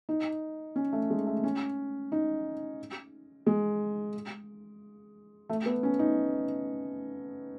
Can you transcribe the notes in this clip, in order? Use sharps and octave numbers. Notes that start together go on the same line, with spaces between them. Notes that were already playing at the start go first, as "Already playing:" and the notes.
D#4
C#4
A3
G#3
A3
C#4
D#4
G#3
A3
B3
C#4
D#4